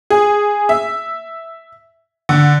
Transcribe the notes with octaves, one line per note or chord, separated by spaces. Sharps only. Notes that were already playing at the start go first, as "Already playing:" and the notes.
G#4
E5
D3